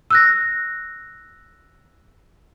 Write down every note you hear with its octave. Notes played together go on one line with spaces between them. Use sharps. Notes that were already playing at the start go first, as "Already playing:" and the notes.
E6 F#6 A#6